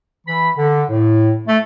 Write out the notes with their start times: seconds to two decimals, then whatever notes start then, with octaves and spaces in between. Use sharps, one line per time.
0.27 E3 B5
0.57 D3
0.90 A2
1.47 A3